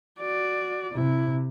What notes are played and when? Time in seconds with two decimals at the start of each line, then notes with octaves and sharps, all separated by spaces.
0.20 F#4 D5
0.94 C3 E4